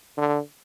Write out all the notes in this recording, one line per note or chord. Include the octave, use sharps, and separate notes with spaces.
D3